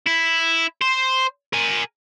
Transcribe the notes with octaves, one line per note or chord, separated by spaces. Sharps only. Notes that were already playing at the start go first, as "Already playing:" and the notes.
E4
C5
A#4 G#5